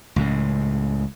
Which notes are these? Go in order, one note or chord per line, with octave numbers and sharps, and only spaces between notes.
C#2 A2 C#3